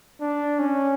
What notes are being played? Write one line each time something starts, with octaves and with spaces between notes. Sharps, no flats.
D4
C#4